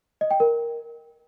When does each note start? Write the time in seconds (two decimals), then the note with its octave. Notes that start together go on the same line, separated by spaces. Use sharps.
0.21 D#5
0.31 G5
0.40 A#4